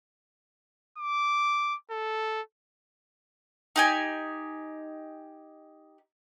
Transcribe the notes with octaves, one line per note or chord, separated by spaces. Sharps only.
D6
A4
D#4 G4 G#5